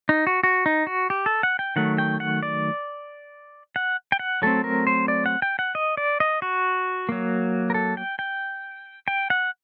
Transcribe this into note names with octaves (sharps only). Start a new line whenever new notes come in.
D#4
F#4
F#4
D#4
F#4
G4
A4
F#5
G5
D#3 F#3 A3 F#5
G5
F#5
D5
F#5
G5
F#5
F#3 A3 C4 A4
A#4
C5
D5
F#5
G5
F#5
D#5
D5
D#5
F#4
F#3 A#3
A#4
A4
G5
G5
G5
F#5